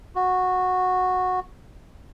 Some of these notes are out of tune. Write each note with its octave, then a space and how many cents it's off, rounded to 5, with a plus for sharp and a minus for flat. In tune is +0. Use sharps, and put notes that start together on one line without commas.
F#4 -10